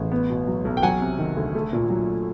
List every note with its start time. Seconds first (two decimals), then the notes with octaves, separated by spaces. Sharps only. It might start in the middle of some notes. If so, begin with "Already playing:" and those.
Already playing: A1
0.12 B3
0.30 B2
0.47 F#3
0.65 B1
0.77 G5
0.83 F#3 F#5 G#5
1.01 C3
1.19 D#3
1.37 D2
1.55 A3
1.73 A#2
1.90 F#3